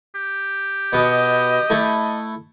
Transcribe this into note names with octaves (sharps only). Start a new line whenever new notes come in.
G4
B2 B3 D#5
A3 E4 A4